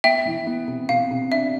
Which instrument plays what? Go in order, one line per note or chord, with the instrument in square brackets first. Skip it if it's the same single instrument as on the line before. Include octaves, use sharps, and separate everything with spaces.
[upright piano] B3 [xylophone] E5 G5
[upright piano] E3
B3
C3
[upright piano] C3 [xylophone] F5
[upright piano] C3
[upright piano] D4 [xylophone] E5